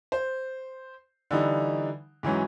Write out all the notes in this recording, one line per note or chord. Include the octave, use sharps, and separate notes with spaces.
C5
D3 E3 G3 D#4
G#2 E3 F#3 C#4